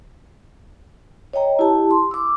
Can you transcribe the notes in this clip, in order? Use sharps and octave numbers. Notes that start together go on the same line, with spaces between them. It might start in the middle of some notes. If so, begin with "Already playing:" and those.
C#5 D#5 G5 A#5
E4 G4 A5
C6
D6 E6